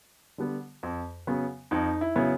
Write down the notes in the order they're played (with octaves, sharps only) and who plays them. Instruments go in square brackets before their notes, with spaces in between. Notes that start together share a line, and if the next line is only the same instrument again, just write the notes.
[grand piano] D3 G3 B3
F2
C#3 F#3 B3
F2 D#4
E4
C#3 F#3 B3